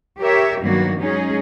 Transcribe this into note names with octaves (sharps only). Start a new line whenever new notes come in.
G4 A#4 C#5 E5
G2 D#3 F#3 A#3 B3 F#4
F#3 G#3 C#4 D#4 G#4